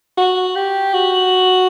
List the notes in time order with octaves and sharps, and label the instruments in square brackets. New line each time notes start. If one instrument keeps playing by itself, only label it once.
[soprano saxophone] F#4
G4
F#4